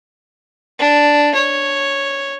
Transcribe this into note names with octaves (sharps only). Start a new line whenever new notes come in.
D4
C#5